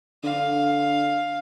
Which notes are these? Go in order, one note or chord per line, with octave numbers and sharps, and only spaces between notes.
D3 F5